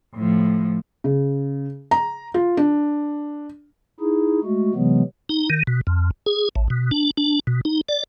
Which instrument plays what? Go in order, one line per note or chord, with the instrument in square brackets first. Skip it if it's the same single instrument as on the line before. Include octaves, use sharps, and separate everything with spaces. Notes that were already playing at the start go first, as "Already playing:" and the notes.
[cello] A2 F3
[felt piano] C#3
A#5
F4
D4
[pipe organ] D#4 E4 G#4
G#3 A3 F#4
C3 E3 F#3 G#3 B3
[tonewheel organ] D#4
D#3
B2
F2
G#4
A1
B2
D4
D4
B2
D#4
D5